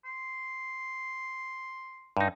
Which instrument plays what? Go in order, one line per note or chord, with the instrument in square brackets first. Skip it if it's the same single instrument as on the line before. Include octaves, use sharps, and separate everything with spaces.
[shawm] C6
[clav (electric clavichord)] G2 D#4